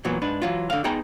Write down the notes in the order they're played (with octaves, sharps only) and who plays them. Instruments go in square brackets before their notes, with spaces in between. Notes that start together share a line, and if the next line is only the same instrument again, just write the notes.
[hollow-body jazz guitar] A#2 E3 F#3 B3
G#2 D4 B4
E3 F#3 F4
D3 F5
B3 D#4 G#4 G5 A#5